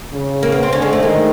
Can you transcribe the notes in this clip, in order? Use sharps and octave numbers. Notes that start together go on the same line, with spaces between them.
C#3
A#3
B3
C4
D3 C#4
G#3
A3
D#3 G#3